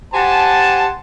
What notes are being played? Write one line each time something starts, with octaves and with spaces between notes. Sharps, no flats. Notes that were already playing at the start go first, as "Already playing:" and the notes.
G4 C5 F#5 G#5 A5